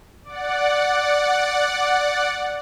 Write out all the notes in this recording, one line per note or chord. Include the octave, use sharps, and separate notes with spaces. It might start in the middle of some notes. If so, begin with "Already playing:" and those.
D5 F#5